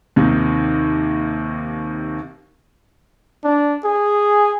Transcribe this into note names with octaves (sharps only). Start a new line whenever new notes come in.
D#2 C3 D#3
D4
G#4